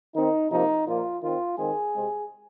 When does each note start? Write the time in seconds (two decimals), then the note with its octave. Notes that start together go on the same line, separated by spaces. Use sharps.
0.15 D#3 C4 D#4
0.50 C3 F3 A#3 D#4
0.86 A#2 F3 A#3 F4
1.22 D#3 C4 F4
1.58 D#3 G#3 C4 G#4
1.94 C3 G#3 C4